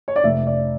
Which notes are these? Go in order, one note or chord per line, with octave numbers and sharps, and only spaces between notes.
C#5
D5
F1 E5
D5